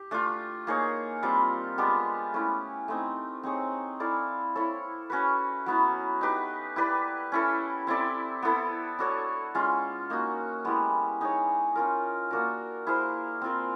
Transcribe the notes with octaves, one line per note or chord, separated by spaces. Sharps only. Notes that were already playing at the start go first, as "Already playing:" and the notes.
Already playing: G4
A3 D4 F4
A#3 D#4 G#4 C#5
G3 C4 F4
G#3 B3 D4 G4
A3 C#4 E4
A3 C4 D#4
C4 D#4 G#4 C#5
E4 A4 D5 F5
E4 A4 C#5
C#4 F#4 B4
F#3 B3 E4
D#4 G4 B4
E4 G4 B4 D5
C#4 E4 A4
C4 E4 A4 D5
B3 E4 A4
D4 F#4 A4 C#5
G#3 C#4 F4
A#3 D#4 F#4
G#3 B3 E4 G4
D#4 G#4 C#5
C#4 F4 A#4
A#3 D4 F#4 A#4
E4 G#4 C5 F5
C4 F4 A#4